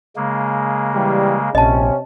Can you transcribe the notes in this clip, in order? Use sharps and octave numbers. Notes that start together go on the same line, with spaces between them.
C#3 G#3 A#3
E3 G3
A#1 C3 C#4 D#5 A5